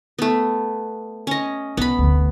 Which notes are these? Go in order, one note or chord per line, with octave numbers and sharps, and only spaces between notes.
A3 B3
C#4 D#5
C2 B3 B5
F1 D2